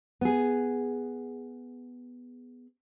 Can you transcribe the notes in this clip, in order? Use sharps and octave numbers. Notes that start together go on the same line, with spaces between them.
B3 G#4